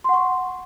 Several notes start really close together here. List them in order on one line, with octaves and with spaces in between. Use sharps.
C6 F#5 C#6